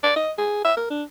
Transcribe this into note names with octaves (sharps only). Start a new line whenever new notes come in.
D5
D#5
G#4
E5
A#4
D4